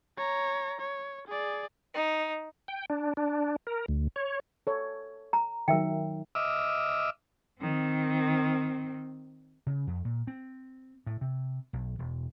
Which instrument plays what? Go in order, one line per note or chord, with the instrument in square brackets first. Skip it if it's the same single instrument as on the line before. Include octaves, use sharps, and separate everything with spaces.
[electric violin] C#5 A#5
C#5
G#4 D5
[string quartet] D#4
[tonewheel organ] G5
D4
D4
A#4
D2
C#5
[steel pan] A4 C#5
[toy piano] A#5
[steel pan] D#3 F#3 [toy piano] A#4 E5 G5
[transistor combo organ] D#5 E5 D6 E6 F6
[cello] D#3 C4
[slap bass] C#3
F2
A#2
C4
A2
C3
B1
E1